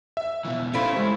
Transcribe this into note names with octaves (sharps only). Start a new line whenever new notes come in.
E5
B2 E3
A3 C#4 E4 C5 F5
G3 G#3